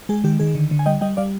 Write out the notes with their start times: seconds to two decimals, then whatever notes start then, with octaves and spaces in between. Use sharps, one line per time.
0.09 G#3 G#4
0.24 D#3 G4
0.40 D#3 G#4
0.55 D3
0.71 D3
0.79 G#5
0.86 G3 D#5 G5
1.01 G3 D#5 G5
1.17 G3 D5 F5